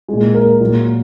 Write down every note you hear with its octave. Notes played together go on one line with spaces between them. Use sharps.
A#2 G#3 G#4
A#4
A#2 F#3